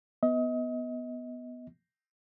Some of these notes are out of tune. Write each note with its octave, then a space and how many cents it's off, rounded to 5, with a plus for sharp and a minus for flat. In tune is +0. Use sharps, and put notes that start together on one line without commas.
B3 +0 D#5 +30